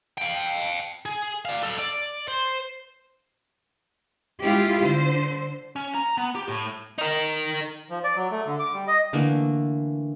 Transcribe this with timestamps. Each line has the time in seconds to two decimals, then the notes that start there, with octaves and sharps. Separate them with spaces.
0.18 F5 G5
1.06 G#4
1.45 D5 F5
1.63 A4 F5
1.79 D5
2.28 C5
4.41 G#3 E4 F4 G4
4.80 D3 C5
5.76 C#4
5.95 A#5
6.17 B3
6.35 G4
6.48 A2
6.98 D#4 A#4
7.90 F3
8.04 D5
8.16 F#3
8.31 A3
8.46 D3
8.59 D6
8.73 G3
8.88 D#5
9.13 D3 E3 A3 A#3